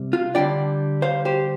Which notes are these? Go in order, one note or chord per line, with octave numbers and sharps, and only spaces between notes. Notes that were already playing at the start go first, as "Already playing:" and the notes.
Already playing: C3 G3
F4
D3 G3 D4 D5 G5
C5 F5
G4 C5